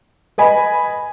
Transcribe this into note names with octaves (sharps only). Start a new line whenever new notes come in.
B4 D#5 G#5 B5